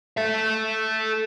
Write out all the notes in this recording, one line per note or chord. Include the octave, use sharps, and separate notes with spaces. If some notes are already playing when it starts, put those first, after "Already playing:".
A4 E5